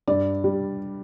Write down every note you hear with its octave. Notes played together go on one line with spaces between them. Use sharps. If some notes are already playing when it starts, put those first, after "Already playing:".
G2 D5
G3